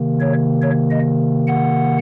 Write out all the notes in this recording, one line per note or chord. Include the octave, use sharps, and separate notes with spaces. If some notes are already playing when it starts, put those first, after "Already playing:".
Already playing: C3 D#3 A#3
C#5
C#5
D#5
F#5